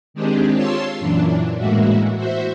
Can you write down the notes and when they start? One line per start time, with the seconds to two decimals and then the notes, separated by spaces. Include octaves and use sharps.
0.14 D#3 G#3 C4 D4 G4 G#4
0.54 F4 C#5 A5 C6 E6
1.00 F#2 A#2 E3 D4
1.57 A2 E3 G#3 A#3 E4 F#4
2.16 F#4 C5 E5